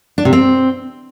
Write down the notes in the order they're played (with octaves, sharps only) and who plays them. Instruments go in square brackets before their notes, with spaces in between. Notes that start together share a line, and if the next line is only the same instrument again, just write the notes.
[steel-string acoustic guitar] D4
C3
C4